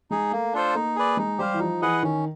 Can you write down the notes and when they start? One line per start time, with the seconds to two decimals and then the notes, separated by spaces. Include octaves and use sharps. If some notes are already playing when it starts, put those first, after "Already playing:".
0.11 G#3 D#4 G#4
0.32 A3 A#3
0.53 D4 F4 A4 C5
0.75 A#3 D#4
0.96 G#4 B4 D5
1.17 G#3 D#4
1.38 G3 G4 C5 F5
1.54 E3
1.60 F3 D#4
1.82 E3 G#4 B4 D#5 F#5
2.03 D#3 C#4